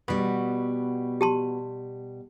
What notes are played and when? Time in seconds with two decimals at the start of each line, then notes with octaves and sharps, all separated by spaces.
0.08 B2 G3 B3 F#4 B5
1.21 G4 A5 C6